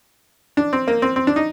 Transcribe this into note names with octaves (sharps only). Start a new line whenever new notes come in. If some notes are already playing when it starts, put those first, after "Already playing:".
D4
C4
A#3
C4
C4
D4
D#4